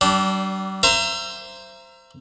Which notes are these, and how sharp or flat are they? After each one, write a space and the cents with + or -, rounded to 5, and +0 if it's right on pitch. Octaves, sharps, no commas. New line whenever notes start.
G3 -40 D4 -15
C5 +0 E5 +35 A#5 +0